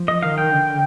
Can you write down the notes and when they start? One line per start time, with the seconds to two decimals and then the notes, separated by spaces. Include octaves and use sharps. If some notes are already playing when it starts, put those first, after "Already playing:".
Already playing: F3
0.08 D#5
0.23 D#3 F5
0.38 G5
0.52 D3